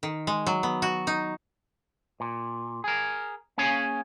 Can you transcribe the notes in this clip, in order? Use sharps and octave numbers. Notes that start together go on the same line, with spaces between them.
D#3
G#3
F#3
B3
F#4
D#4
A#2
G#4 A#4
A#3 C#4 G#4 C#5 F5 G#5